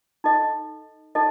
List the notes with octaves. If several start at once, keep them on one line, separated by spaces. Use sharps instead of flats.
D#4 A4 D#5
D#4 A4 D#5